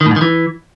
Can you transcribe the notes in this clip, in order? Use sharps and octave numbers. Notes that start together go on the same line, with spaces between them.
D#3
A2
G#2
D#3
E3